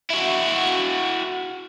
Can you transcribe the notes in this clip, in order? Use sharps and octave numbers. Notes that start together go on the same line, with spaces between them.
E4 F#4